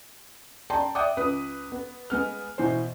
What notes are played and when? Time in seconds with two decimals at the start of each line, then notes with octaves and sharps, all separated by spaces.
0.70 D5 G5 A5 A#5 C6
0.95 D5 E5 F#5 G5 D6 D#6
1.17 C#2 B4 D#6
1.72 B3
2.10 G#3 B3 F6
2.58 B2 E3 C5